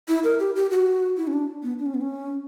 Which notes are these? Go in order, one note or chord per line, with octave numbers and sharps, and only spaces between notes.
E4
A#4
G4
G4
F#4
E4
C#4
D4
B3
D4
C#4
B3
C#4